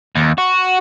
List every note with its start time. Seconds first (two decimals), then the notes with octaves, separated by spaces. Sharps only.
0.16 D#2
0.38 F#4